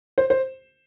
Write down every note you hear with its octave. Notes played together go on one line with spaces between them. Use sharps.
C5
C5